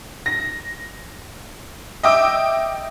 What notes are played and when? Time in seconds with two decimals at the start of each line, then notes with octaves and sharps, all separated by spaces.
0.26 A#6
2.03 D#5 E5 G5 D6 E6